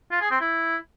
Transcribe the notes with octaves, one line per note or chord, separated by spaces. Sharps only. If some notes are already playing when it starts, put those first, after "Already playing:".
F4
G#4
C4
E4